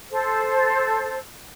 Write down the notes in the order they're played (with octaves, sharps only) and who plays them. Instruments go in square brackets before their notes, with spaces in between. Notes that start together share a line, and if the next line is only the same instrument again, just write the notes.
[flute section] A4 C5